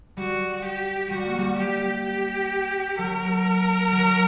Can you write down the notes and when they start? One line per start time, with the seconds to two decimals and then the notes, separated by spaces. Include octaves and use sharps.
0.17 G3 F#4
0.64 G4
1.10 G3 F#4
1.25 A#3
1.38 G3
1.57 G4
2.04 G4
2.98 F#3 A#4
3.92 F#3